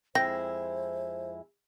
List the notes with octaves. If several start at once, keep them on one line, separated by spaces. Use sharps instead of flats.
F2 G#3 E4 C5 G5 A#6